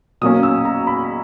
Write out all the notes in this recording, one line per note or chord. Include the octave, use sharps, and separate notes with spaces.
B2 F#3 A#3 C#4 D#6
E6
A#5
B5